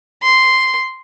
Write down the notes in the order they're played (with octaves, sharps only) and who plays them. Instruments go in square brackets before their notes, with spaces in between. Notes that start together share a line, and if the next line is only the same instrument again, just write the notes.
[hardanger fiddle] C6